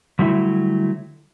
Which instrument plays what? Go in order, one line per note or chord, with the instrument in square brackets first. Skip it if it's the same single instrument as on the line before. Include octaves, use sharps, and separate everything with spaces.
[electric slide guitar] D3 F#3 G3 A3 C#4 E4